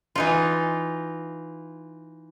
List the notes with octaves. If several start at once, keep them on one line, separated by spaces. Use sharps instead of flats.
E3 D#4 F4